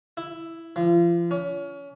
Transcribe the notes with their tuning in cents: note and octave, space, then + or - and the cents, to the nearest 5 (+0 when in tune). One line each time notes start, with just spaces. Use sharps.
E4 +5
F3 -35
C#4 +30